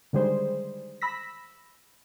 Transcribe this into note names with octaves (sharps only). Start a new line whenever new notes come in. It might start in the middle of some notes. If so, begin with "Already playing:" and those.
D3 D#3 G3 G#3 G#4 C5
B5 E6 A#6 B6